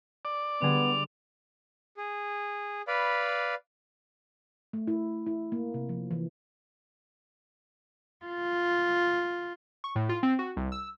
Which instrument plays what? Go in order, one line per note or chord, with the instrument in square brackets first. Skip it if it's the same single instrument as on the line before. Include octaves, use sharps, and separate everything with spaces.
[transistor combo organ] D5
[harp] D3 G3 G#4 [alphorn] B3 [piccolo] F7
[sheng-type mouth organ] G#4
B4 D5 F5 B5
[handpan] A3
E4
E4
A#3
C3
F3
E3
[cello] F4
[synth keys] C#6
A2
F4
C4
F#4
C2
E6